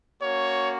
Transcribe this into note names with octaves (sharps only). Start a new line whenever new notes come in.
A#3 C#4 F#4 C#5